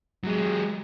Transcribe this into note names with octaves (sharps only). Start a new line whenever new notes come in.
F#3 G#3